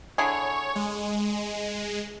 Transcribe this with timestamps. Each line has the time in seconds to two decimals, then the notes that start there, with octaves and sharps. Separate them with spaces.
0.18 D3 E4 G#4 C#5
0.75 G#3